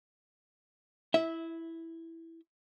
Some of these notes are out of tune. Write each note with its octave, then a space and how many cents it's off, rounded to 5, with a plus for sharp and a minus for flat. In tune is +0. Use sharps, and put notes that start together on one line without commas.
E4 +0 E5 -20